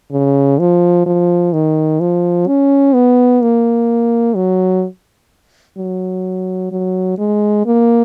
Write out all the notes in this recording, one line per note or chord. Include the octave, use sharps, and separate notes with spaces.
C#3
F3
F3
D#3
F3
C#4
B3
A#3
F#3
F#3
F#3
G#3
A#3